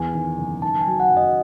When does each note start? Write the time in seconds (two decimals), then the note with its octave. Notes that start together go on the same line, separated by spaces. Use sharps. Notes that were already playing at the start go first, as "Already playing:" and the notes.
Already playing: E2 G#5
0.14 D#3
0.38 F#1
0.62 D#3 A5
0.81 G#5
0.87 F#3
1.00 F#5
1.11 F#2
1.17 D#5